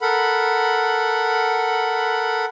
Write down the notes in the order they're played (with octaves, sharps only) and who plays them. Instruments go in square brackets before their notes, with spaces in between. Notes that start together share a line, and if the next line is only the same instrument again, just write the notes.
[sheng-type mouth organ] A4 A#4 F#5 B5